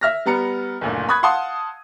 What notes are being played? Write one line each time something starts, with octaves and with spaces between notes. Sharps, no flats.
E5 F6 A#6
G3 B3 A#5 C#7
F#1 D2 A#2
B5 C#6 D#6 F#6 G#6
F5 F#5 A5 C6 D#6